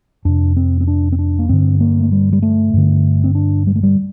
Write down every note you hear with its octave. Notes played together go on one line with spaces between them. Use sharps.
F2 C3 D4
C4
C4
D4
C4
D4
A#3
G2 D3 C4
A#3
A3
G3
G3
A3
G2 D3
C4
D4
G3
A3
G3